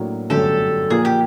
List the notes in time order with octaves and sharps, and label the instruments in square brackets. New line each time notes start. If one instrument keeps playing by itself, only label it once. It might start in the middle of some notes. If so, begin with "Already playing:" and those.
Already playing: [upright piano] A2 F#3 A#3 D4
[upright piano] G1 F#2 D3 F#3 A3 [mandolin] G4 A4
[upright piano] A#2 F3 A#3 [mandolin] G#4
[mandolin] G4